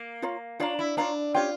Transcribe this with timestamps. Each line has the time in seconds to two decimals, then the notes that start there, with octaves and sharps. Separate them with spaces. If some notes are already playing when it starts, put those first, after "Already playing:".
Already playing: A#3
0.22 F4 C#5 F5 A#5
0.60 D4 F4 C#5 F5 A#5
0.79 E4
0.97 D4 F4 C#5 F5 A#5
1.34 C#4 F4 G4 C#5 G5